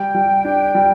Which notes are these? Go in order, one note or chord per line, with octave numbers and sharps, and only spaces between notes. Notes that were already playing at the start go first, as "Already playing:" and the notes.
Already playing: G3 G5
G3
D4
G3